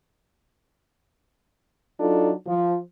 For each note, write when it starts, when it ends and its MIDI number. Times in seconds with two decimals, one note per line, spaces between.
2.00 2.32 54
2.00 2.32 62
2.00 2.32 63
2.00 2.32 65
2.00 2.32 69
2.47 2.77 53